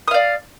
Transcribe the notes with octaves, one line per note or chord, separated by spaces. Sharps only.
D5 F5 D#6